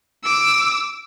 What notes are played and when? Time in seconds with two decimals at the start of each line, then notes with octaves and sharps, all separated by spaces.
0.24 D6 E6